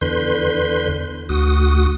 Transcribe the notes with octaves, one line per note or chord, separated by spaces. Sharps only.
E2 D3 B4 C6 G6
D2 F#4 D#6